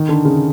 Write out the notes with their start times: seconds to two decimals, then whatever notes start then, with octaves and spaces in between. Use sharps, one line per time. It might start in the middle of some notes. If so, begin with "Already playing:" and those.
Already playing: D#3
0.09 D3
0.25 C#3